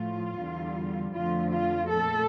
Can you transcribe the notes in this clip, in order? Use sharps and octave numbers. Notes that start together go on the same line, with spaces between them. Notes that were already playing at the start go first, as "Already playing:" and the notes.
Already playing: A2 F3 A3 F4
E2 D3 G3
F2 D3 F3 A3 F4
F4
A#2 A3 A4